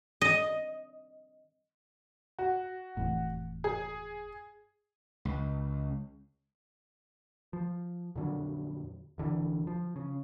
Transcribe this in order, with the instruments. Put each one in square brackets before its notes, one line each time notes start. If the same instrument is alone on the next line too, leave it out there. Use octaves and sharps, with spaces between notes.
[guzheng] D#5
[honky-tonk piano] F#4
[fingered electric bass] F1 E2 A2
[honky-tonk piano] G#4
[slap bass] C#2
[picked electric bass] F3
F2 A#2 D3 F#3
F1 D3 E3
F3
C#3